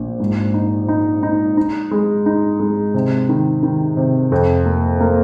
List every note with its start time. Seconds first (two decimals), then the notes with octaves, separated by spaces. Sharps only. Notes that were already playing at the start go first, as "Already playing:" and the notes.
Already playing: A#1
0.20 G#2
0.54 D#4
0.88 D#4
1.23 D#4
1.57 D#4
1.91 G#3
2.26 D#4
2.60 G#3
2.94 C3
3.29 D#3
3.63 D#3
3.97 C3
4.32 F2
4.66 A#3
5.00 A#3